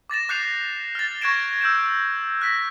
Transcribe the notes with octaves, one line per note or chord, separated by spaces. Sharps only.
D6 A6 A#6 E7
D6 F#6 G6 C7 C#7 F7
F6 A6
C#6 F#6 G#6 A#6 D7 E7
E6 G6 D7 E7
F#6 A#6 B6